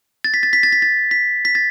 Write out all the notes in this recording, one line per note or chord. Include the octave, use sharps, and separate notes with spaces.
A6
B6
A6
B6
A6
B6
A6
B6
B6
A6